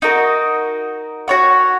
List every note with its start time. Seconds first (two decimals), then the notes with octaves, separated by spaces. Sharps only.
0.02 D#4 F#4 A#4 D#5
1.28 F#4 C#5 F#5